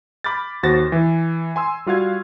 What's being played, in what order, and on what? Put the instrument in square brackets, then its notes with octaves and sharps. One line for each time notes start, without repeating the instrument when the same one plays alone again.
[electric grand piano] B5 D6 F6 G6 A6
D#2 F#4 C5 A6 A#6
E3
G#5 C6 E6
G3 F4 F#4 F5 G#6